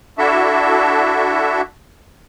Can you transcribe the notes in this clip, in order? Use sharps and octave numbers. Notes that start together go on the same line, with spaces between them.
D4 E4 F#4 A4 E5